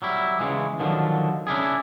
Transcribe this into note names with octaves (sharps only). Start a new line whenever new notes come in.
F#3 G3 E4
C#3 E3 G#3
D3 D#3 F3 F#3
C#4 D4 E4 G#4